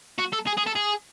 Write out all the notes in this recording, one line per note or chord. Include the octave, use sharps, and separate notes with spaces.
F#4
A4
G#4
G#4
A4
G#4